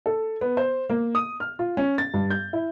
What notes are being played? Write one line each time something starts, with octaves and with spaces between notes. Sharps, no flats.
A4
B3
C5
A#3
D#6
F6
F4
C#4
A6
G2
G6
E4